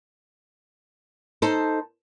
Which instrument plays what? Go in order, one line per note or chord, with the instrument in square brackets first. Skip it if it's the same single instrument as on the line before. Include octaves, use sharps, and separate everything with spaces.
[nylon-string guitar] D#4 A4 C5